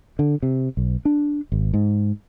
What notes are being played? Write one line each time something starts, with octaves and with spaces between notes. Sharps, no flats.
D3
C3
B1
D4
G#1
G#2